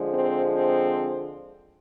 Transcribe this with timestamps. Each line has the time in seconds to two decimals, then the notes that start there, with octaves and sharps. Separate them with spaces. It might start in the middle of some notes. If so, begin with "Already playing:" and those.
Already playing: D3 F3 G#3
0.13 C4
0.55 C4